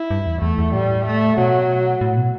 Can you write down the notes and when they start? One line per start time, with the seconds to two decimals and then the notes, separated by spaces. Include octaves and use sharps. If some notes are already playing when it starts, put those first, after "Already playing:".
Already playing: E4
0.11 G2
0.27 E2
0.42 E2 A3
0.58 E2
0.73 A2 G3
1.06 A3
1.38 B2 F#3
2.01 A2
2.17 B2